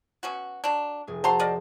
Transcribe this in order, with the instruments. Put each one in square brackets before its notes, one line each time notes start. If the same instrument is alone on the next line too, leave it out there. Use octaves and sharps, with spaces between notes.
[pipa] B2 C#4 F#4
F#3 D4
[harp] F1 G#4
[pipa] F#3 A#5 C6 [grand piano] F#4 C5 A5
[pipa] A#4 D5 D#5